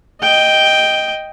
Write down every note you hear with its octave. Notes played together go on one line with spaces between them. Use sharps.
D#5 G5